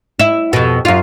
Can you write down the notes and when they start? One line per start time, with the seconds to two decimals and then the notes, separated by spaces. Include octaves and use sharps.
0.19 E4
0.53 F2 B2
0.85 F#2 F4